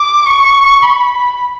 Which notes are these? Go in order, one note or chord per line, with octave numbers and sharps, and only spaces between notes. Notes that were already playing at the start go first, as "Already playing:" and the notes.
Already playing: D6
C#6
B5